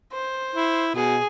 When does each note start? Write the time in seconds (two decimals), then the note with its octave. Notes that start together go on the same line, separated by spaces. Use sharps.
0.12 C5
0.54 E4
0.95 B2 G#4